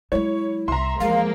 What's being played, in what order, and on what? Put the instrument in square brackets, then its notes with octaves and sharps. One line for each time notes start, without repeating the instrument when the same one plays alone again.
[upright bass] F#3 G#3 [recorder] E4 [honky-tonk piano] C#5
[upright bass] C2 [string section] E5 [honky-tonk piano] A#5 C6
[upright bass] E2 [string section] F3 G#3 A#3 [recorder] F5